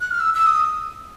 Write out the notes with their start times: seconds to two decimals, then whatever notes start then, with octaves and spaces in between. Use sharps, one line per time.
0.01 F#6
0.11 F6
0.20 E6
0.34 E6
0.47 D#6